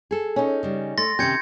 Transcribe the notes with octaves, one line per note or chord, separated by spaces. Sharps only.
G#4 A4
C#4 D#4
C#3 G3
A3 C6 A6 A#6
C3 D#3 C#4 G4 G6 G#6 C#7